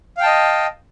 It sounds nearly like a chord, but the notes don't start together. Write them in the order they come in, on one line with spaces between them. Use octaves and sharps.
F5 G5 A5 D#5